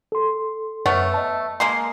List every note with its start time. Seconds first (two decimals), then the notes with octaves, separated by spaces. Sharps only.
0.12 A4 C6
0.86 F#2 A3 B3 C#5 F6
1.14 D#5 A5
1.60 G#3 A#3 C6